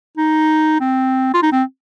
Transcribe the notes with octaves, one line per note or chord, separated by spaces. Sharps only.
D#4
C4
F4
D#4
C4